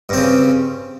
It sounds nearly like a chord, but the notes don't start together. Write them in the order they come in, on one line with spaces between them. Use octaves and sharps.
G2 C4 C#3